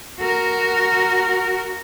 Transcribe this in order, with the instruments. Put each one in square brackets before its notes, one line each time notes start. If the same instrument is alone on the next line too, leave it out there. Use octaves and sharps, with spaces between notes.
[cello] F#4 A#4